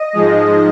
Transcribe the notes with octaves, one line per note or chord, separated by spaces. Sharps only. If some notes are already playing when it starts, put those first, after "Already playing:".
Already playing: D#5
G#2 F3 G#3